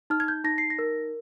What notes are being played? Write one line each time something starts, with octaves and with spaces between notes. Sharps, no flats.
D#4 F6
G#6
G6
D#4 A#6
C7
A#6
A#4